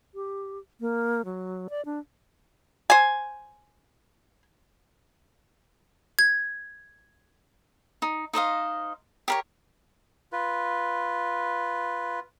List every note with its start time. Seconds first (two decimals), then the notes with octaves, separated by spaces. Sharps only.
0.15 G4
0.80 A#3
1.25 F#3
1.70 D5
1.85 D4
2.90 C5 G#5
6.19 G#6
8.02 D#4
8.33 D#4 C5 D#5 F5
9.28 G4 A#4 C#5
10.32 F4 B4